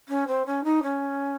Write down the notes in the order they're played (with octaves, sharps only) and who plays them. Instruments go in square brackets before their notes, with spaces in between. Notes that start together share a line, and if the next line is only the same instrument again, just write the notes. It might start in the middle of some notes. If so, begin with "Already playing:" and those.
[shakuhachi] C#4
C4
C#4
D#4
C#4